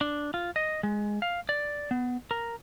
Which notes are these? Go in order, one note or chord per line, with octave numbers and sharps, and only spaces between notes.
D4
F4
D#5
G#3
F5
D5
B3
A#4